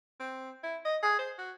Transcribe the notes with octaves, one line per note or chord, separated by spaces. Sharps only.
C4
E4
D#5
G#4
C5
F#4